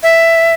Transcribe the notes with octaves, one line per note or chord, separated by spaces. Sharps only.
E5